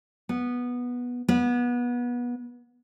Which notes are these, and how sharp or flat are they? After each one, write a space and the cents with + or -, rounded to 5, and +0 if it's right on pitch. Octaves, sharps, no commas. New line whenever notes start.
B3 -10
B3 -25